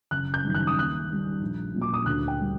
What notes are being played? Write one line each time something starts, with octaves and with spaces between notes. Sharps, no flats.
F#1 F#6
G6
F#2 D#3 G3
F#6
D#6
D#2 F#6
D#3 G3
A#1
A#2 F#3
D6
D#6
D2 F#6
G5
D3 G3